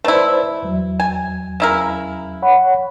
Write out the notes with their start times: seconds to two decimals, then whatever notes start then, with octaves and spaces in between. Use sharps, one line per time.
0.04 A3 E4 B4 C5 D5
0.63 E2 F#3
1.00 G#5
1.60 C#3 E4 A#4
2.42 C#5 F#5 B5